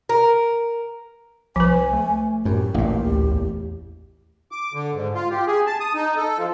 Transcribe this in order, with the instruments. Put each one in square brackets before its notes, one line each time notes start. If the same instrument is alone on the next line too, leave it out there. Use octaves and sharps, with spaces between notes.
[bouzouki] A#4
[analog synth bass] C2 [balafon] F3 B4 [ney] G#5
[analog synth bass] A3
[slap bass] F#2 [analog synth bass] A2 [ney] G4
[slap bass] A1 A#2 [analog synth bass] A#3
[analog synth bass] D2
E2
[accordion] D6
D3
G#2
F4
G4
G#4
A5
D#6
D#4
A4
F3